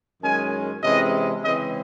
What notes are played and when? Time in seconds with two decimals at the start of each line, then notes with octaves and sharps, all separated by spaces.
0.23 F#2 D#3 G#3 C#4 G#5
0.83 C3 E3 G#3 C#4 D#5
1.44 C#3 E3 G#3 C4 D#5